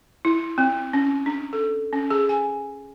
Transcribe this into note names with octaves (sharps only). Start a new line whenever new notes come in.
E4
C4
C#4
D4
A4
C#4
G#4
G#5